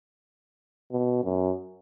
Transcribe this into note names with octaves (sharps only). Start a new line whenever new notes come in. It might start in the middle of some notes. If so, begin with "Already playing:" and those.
B2
F#2